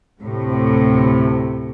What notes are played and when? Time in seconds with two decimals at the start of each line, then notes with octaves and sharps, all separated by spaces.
0.20 D2 A2 C3